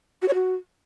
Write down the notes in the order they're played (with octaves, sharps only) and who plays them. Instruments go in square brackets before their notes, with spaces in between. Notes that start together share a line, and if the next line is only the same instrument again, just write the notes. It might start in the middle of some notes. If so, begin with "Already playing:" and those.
[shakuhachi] F#4
C#5
F#4